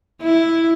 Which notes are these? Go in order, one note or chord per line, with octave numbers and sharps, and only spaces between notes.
E4